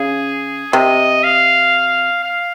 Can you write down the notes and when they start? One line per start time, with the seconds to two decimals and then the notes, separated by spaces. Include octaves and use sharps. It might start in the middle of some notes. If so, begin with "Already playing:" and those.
Already playing: C#3 G#4
0.73 C3 D#5
1.24 F5
2.24 F5